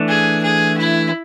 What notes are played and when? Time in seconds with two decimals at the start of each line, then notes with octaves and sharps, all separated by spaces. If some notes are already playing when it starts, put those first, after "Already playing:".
Already playing: E3 A3 D4
0.08 G#4
0.43 G#4
0.77 E4